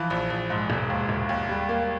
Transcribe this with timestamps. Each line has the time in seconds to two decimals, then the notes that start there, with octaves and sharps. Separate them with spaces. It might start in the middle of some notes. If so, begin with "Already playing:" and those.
Already playing: E3 F3
0.10 A#1
0.30 A#1
0.50 G#2
0.70 E1
0.90 D#2
1.09 E1
1.29 D#2
1.49 G3
1.69 A#3